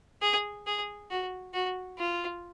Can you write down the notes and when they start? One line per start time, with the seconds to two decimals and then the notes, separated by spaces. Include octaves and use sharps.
0.22 G#4
0.67 G#4
1.11 F#4
1.53 F#4
1.98 F4